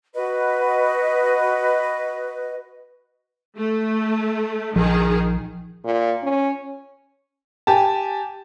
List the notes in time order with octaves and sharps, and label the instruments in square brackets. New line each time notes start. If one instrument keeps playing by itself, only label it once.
[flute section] F#4 B4 D#5
[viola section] A3
[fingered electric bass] A#1 F3 [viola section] D#3 G#4
[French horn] A#2
C#4
[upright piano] G4 G#5 A5